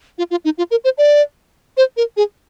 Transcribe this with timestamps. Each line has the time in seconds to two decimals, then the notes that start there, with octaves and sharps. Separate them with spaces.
0.18 F4
0.31 F4
0.45 D#4
0.58 F4
0.71 A#4
0.84 C5
0.98 D5
1.77 C5
1.97 A#4
2.17 G#4